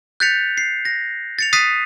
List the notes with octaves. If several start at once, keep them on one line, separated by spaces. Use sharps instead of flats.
F#6 G6 A6 B6 C#7 F7
C7
A#6
A6 C#7 F7
D#6 F#6 A6 B6 C7 D#7